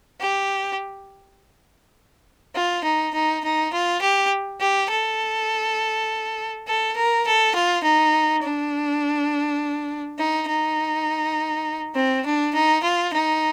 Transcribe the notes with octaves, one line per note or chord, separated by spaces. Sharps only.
G4
F4
D#4
D#4
D#4
F4
G4
G4
A4
A4
A#4
A4
F4
D#4
D4
D#4
D#4
C4
D4
D#4
F4
D#4